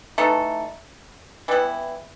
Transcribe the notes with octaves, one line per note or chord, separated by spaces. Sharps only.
E3 A3 D#4 A4
E3 G3 B3 E4